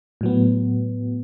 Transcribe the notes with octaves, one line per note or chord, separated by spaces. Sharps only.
A2 F#3 B3